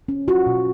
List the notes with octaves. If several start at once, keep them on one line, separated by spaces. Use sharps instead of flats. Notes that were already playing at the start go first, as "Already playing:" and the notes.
C#4
F4 F#4
B2